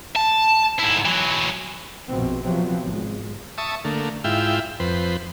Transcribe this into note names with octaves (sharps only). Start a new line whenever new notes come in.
A5
G#2 E4
E3 F#3
A#1 F2 B2 C4
C3 F3 F#3 B3 C4
G#1 G#3
E5 A5 C#6 D#6
D3 A3 A#3
G#2 E4 F4 E5 G5
F2 B4 C5